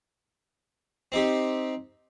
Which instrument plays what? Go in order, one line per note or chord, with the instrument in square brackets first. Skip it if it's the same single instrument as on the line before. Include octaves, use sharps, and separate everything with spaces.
[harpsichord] C4 D#4 G4